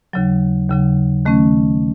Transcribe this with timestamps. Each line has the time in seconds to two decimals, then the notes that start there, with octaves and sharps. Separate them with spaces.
0.13 D#2 C#3 F#3
0.70 D#2 C#3 F#3
1.25 D#3 A3 C#4